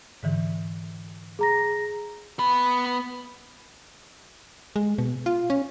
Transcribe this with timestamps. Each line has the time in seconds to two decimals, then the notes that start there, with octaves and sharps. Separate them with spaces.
0.23 G#2 D3 E3
1.39 G#4 A#5 A#6
2.39 B3 B5
4.76 G#3
4.98 B2
5.26 F4
5.50 C#4